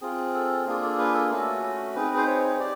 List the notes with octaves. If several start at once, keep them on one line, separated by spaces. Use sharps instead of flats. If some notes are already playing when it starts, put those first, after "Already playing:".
C4 F4 G#4
A4
A#3 D4 F4 G#4
A4
B4
A4
A3 C#4 F#4 A4
C4 D#4 G#4 B4
C5
C#5
G4 D5